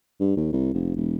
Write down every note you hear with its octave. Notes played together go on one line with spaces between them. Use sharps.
G2
D#2
C2
F1
E1